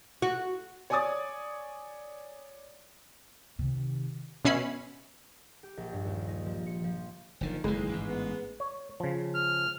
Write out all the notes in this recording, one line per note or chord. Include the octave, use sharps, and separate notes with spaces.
F#4
C#5 D5 G#5 D6 D#6 A6
C3 D#3
B2 C#4 E5 B5 C7
G4
A#1
G2
D#2
D#4
F3
C#7
F3
F#1 D3 D#3 F3
F#1 E2 D#3 E3 G#3
A1 G#2
B3
C#5
C#3 F3
F6